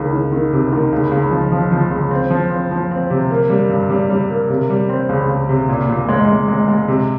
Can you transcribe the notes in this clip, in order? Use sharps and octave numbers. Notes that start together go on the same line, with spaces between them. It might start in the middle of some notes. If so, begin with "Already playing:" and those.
Already playing: C#2 D#3
D#3
D#3
C3
D#3
C#2
C#2
F3
F3
F3
C#2
C4
F3
C4
F3
C4
C3
A#3
G3
G2
G3
G3
A#3
C3
G3
C4
C#2
C#2
C3
A#2
A#2
G#3
G#3
G#3
G#3
C3